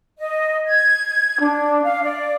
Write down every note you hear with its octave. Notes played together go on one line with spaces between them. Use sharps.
D#5
G#6
D4
F5
D5